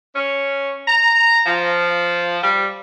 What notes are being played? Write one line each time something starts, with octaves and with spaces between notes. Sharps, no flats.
C#4
A#5
F3
G3